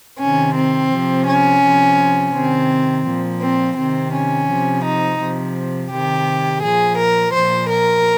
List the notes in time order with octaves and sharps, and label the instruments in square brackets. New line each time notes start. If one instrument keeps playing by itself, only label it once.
[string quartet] C3 D#3 C#4
C4
C3 F3
C#4
C3 F3
C3 D#3 C4
A#2 F3
C4
C3 D#3 C4
C#4
C3 F3
D#4
C3 F3
C3 D#3 G4
A#2 F3 G#4
A#4
A#2 F3 C5
A#4